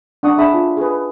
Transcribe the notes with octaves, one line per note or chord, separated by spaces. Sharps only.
D4 F#5 C#6 D#6
D4 G#4 E5 A5 B5 D#6
F4
G#4 B4